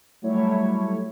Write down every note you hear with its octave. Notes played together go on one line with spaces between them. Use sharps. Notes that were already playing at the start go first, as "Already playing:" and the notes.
F#3 G3 A3 E4 C#5